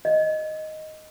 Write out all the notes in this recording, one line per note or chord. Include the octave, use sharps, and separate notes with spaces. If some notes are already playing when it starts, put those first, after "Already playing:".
D#5